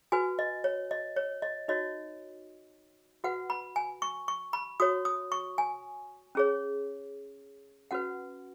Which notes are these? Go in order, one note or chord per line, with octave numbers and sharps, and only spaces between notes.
F#4 B4 G#5
D#5
C#5
D#5
C#5
D#5
D#4 F#4 C#5 D#5
F#4 B4 F#5
B5
G#5
C#6
C#6
B5
F#4 C#5 D#6
D#6
C#6
G#5
C#4 G#4 C#5
C#4 F#4 B4 F#5